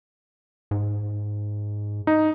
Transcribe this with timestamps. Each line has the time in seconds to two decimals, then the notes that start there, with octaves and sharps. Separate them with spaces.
0.71 G#2
2.07 D#4